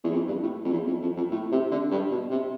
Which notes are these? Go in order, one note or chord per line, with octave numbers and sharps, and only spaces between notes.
E2
F2
G2
A2
F2
E2
F2
F2
F2
A2
C3
D3
G2
B2
C3